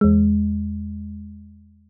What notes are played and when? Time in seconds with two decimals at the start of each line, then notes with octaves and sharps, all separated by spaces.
0.01 E2 G#3